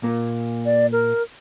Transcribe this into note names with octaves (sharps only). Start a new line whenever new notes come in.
A#2 A#3
D5
A#4